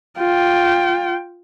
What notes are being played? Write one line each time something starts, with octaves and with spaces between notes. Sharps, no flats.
F4 G5